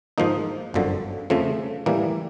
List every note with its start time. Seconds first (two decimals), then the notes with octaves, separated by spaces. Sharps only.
0.18 G#2 F3 A#3 D#4
0.74 G1 F#2 D3 F3
1.30 F2 C#3 F3 A3
1.86 A2 E3 G3 A#3